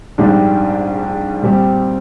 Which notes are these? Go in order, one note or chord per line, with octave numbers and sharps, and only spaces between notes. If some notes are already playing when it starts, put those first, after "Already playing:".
A#1 G#2 G3 D4 G4
A#2 G3 C4 G4